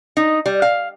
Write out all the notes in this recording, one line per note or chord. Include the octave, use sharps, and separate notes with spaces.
D#4
G3
F5